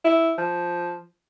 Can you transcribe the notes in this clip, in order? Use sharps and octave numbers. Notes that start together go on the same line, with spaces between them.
E4
F3